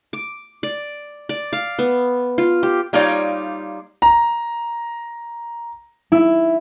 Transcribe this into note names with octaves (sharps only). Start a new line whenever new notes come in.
D6
D5
D5
F5
B3
F4
G4
G3 A#3 D#4 F4 C#5 D5
A#5
E4